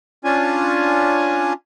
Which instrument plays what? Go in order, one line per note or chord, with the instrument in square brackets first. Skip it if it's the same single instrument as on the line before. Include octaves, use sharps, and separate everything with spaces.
[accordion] C#4 D4 F4 G#5